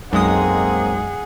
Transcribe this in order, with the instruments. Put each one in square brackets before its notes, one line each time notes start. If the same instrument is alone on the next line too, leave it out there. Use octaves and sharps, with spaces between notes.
[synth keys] B1 G#3 D#6 [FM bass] F#2 [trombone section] A#3 C4 [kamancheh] G#4 F#5